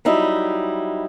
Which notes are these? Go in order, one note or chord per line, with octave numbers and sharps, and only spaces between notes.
F#3 G3 D#4 E4